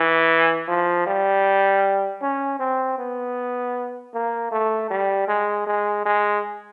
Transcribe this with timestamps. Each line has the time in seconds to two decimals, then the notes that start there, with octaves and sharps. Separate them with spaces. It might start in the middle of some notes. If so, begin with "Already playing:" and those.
Already playing: E3
0.68 F3
1.07 G3
2.22 C#4
2.60 C4
2.98 B3
4.14 A#3
4.51 A3
4.90 G3
5.28 G#3
5.67 G#3
6.06 G#3